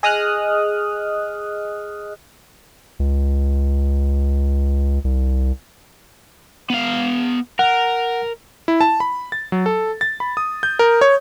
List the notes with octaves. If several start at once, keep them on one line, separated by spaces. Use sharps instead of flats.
G#4 D#5 D#6 F6 F#6
C#2
C2
B3 F5
A#4 F#5
E4
A5
B5
A6
F#3
A4
A6
B5
D#6
G6
A#4
C#5